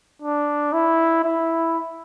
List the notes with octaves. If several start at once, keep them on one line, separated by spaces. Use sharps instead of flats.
D4
E4
E4